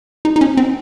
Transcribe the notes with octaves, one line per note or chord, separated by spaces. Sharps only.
D#4
D#4
C#4
C4